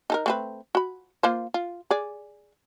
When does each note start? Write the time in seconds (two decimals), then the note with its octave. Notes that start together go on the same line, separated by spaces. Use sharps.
0.10 D#4 A4 A#4
0.26 A3 C4 B4
0.75 F#4 B5
1.23 A#3 F4 C5
1.54 F4
1.91 G#4 D5